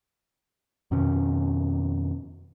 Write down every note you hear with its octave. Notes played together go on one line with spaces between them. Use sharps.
F2 B2 D#3 C#4